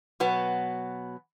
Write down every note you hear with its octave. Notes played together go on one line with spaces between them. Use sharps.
B2 F#3 B3